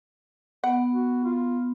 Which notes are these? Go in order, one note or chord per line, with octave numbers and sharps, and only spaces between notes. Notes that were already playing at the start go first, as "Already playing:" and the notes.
B3 F#5
F#4
F4